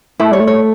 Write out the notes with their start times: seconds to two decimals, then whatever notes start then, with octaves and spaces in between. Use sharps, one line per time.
0.20 A3 E4
0.32 G3 C#5
0.40 A3
0.47 C#5